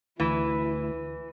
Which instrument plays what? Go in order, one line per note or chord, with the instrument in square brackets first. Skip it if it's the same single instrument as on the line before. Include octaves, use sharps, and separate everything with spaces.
[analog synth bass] D2 [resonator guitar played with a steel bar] E3 [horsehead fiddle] E4